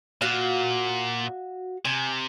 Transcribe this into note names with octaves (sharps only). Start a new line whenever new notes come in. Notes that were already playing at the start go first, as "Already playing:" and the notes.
A#2 F#4 F5
C3 G#5